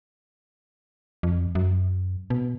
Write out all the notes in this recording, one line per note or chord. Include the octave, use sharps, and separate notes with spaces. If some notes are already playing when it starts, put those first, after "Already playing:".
F2
F#2
B2